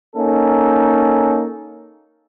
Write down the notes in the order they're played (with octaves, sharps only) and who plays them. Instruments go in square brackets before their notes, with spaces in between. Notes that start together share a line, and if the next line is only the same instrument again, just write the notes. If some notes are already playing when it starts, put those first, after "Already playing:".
[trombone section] A#3 C#4 D#4 A4